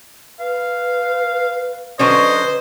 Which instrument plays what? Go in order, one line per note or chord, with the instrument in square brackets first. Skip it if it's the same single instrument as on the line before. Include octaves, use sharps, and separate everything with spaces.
[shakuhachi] B4 [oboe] F5
[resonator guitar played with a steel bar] D3 F#3 C#4 [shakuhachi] B4 [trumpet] C5 [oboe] D#5